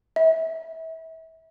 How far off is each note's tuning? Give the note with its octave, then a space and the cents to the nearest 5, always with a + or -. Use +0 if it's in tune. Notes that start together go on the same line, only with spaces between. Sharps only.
E5 -30